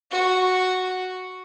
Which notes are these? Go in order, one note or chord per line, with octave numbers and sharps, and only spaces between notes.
F#4